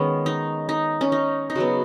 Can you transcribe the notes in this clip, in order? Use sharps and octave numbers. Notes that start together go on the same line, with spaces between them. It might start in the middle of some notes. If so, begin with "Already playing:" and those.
Already playing: D#3 G#3 B3 C#4
D#4
D#4
C#4
D#4
D#4
C#3 F#3 B3 F#4